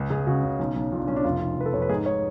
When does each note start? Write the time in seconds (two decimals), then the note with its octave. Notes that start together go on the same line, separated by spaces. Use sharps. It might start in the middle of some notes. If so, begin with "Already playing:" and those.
Already playing: C#2
0.10 C#2 G#4
0.27 C#3 F#4
0.43 C#3
0.59 B1
0.76 B1
0.92 B1 F4
1.00 D4
1.08 B1 C#4
1.16 D4
1.24 F1 F4
1.40 F1
1.57 F1 B4
1.66 A4
1.73 F1 C#5
1.82 B4
1.89 G#2 G#4
2.06 C#5